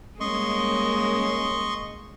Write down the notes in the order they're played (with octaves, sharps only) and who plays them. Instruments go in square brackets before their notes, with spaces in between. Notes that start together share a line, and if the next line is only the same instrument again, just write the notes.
[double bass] G3 A#3 [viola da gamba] G#3 [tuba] C#4 [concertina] D#5 C6 C#6